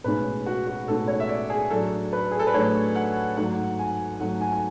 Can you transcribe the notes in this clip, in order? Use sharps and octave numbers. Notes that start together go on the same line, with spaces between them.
B1 A2 G#3 C#4 B4
F#4
F#4
B1 A2 G#3 C#4 A4
C#5
E5
D5
G#4
A2 F#3 A3 D4 A4
B4
G#4
A4
B4
A2 F#3 A3 D4 C#5
F#5
G#2 F#3 A3 F#5
G#5
G#2 F#3 A3 F#5
G#5
G#5